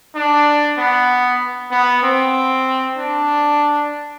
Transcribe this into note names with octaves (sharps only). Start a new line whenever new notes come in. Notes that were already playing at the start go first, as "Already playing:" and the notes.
D4
B3
B3
C4
D4